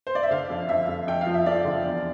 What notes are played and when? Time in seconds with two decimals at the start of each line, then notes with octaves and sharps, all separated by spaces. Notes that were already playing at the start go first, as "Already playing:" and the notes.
0.07 C5
0.15 D5
0.23 E5
0.31 D3 F5
0.50 F2
0.69 F2 E5
0.88 F2
1.07 F2 G5
1.21 F5
1.26 F3
1.34 E5
1.46 F3 D5
1.65 D3
1.84 E2